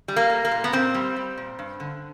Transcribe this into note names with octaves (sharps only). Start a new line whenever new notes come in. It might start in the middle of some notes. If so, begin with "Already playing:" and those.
G3
A#3
G3
A#3
A#2
B3
A#2 C4
G3
G3
A#2
G2
D3